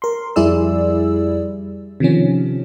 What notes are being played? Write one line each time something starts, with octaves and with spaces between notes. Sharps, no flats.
A#4 C6
F2 G3 E4 G#4 D5 E6
C3 D#3 F3 C#4